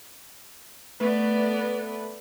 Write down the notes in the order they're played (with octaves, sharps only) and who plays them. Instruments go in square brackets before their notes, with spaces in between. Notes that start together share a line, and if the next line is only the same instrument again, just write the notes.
[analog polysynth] A3 B4 [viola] B3 D5